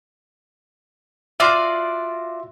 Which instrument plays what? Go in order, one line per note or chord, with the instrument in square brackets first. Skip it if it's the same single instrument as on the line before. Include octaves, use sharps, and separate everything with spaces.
[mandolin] F4 F#4 D5 [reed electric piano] E5 C6